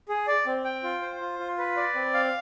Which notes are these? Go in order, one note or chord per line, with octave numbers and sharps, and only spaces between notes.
G#4
D5
C4
G5
F4
C5
F4
F4
B4
D5
C4
F5